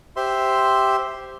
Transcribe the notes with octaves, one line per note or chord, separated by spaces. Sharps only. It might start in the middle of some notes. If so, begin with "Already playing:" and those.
G4 C5 E5 C6